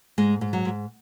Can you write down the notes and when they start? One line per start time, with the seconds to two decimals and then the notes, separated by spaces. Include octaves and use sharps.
0.18 G#2 G#3
0.41 G#2
0.53 F#3
0.65 G#2